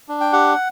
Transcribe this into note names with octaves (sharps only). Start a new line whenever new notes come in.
D4
G5
G4 F#5